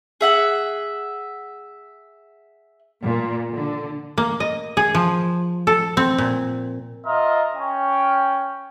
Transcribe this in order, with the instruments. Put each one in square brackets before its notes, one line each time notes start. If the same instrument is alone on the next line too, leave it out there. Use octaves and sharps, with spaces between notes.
[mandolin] G#4 E5 F#5
[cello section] A#2
D3
[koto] A#3
D#5
G#4
F3
A4
C4
A#2
[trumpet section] F4 A#4 D#5 E5
C#4 G5